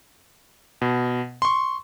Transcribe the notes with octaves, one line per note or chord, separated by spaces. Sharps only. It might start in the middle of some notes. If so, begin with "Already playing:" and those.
B2
C6 C#6